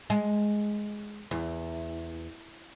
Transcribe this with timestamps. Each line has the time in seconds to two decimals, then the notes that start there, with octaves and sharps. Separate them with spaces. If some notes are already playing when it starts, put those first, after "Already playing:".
0.10 G#3
1.31 E2